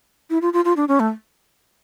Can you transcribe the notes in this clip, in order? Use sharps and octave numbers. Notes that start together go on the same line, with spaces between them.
E4
F4
F4
F4
D4
C#4
A3